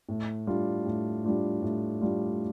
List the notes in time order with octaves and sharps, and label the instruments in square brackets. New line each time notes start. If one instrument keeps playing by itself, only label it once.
[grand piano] A2
G3 D4 F4
A2
G3 D4 F4
A2
G3 D4 F4